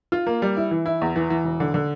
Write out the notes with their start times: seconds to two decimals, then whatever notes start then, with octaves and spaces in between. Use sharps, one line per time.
0.12 F4
0.27 A#3
0.42 G3
0.57 E4
0.71 E3
0.86 E4
1.02 E2
1.16 E3
1.30 E3
1.45 E1
1.60 D3
1.74 D3